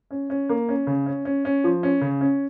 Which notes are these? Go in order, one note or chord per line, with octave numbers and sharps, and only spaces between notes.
C#4
C#4
A#3
C#4
C#3
C#4
C#4
C#4
F3
C#4
C#3
C#4